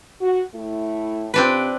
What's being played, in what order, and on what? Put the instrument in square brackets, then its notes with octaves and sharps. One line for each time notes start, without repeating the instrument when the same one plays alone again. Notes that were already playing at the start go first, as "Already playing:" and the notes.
[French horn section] F#4
A2 A3 E4
[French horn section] C3 F4 [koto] C4 D4 B4